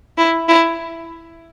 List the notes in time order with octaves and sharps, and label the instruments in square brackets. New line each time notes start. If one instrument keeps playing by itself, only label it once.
[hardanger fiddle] E4
E4